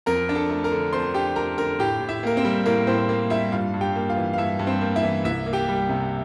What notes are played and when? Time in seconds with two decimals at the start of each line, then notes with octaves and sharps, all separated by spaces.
0.06 F2 A#4 A#5
0.29 D4
0.35 A4 A5
0.49 A3
0.64 A#4 A#5
0.72 D3
0.93 F2 C5 C6
1.14 D4 G4 G5
1.36 A3 A#4 A#5
1.58 D3 A#4 A#5
1.79 A2 G4 G5
2.00 A2
2.09 E4 E5
2.23 A#3 A#4
2.37 C4 C5
2.45 G3
2.66 A2 A#3 A#4
2.87 A2 C4 C5
3.09 A#3
3.30 G3 E4 E5
3.52 G2 F4 F5
3.74 G2
3.81 G4 G5
3.96 A#3
4.09 F4 F5
4.16 E3
4.33 F5
4.38 G2 E4 E5
4.59 G2
4.67 C4 C5
4.81 A#3
4.96 E4 E5
5.03 E3
5.24 C2 E4 E5
5.46 A#3
5.53 G4 G5
5.68 G3
5.89 C3